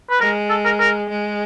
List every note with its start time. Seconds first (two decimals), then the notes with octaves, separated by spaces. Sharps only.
0.10 B4
0.20 G#3 A#4
0.50 A4
0.65 A#4
0.80 A#4
1.10 G#3